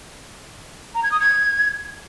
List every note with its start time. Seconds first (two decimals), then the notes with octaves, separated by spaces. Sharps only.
0.95 A#5
1.03 G#6
1.12 D#6
1.20 G#6